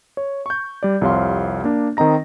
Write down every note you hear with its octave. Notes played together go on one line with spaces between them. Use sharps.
C#5
C#6 G6
G3 D5
C2 F2 C3 C#5 F5 C6
A#3 D4
D#3 C4 D#5 A#5 A#6